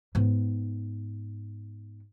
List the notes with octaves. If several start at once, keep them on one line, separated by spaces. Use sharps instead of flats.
G#2 B3